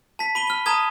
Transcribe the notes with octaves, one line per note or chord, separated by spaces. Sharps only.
A5 B6
B5 D#7 G7
F6 G7
A5 A#5 D#6 G#6 D#7 G7